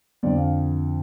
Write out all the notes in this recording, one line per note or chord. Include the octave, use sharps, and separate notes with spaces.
F2 D3 F3 D5
F5